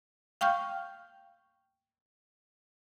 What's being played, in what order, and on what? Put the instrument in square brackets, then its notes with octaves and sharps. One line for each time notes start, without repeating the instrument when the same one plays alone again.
[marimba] F5 G5 C#6 F6 G6